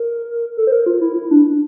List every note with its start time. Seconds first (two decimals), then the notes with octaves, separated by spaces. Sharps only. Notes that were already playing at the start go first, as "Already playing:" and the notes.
Already playing: A#4
0.57 A4
0.67 C5
0.72 A#4
0.86 F4
1.01 E4
1.16 E4
1.31 D4
1.46 D4